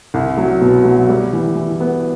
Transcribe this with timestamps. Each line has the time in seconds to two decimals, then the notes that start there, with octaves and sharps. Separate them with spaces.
0.14 C2
0.37 F#3
0.61 B2
0.85 F#3
1.09 G3
1.33 E3
1.56 E3
1.80 B3